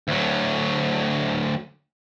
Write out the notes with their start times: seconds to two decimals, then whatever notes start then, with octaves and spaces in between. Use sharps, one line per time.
0.08 D2 F#3